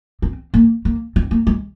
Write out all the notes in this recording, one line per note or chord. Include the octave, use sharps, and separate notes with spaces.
C4
A#3
A#3
C4
A#3
G#3